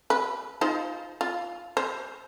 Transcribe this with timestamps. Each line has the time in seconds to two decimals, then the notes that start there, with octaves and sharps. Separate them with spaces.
0.10 B4
0.61 D#4 F4 C5
1.21 F4
1.77 C5